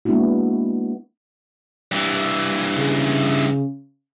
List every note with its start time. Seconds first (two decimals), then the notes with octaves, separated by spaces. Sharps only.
0.05 G#3 A#3 B3 D4 E4 F#4
1.92 G2 E3
2.78 C#3